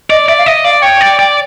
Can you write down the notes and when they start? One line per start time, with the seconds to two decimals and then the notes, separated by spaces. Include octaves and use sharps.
0.10 D5 D#5
0.28 D5 E5
0.38 F5
0.46 D#5 E5
0.64 D5 F5
0.82 C#5 G5
1.01 D5
1.19 D5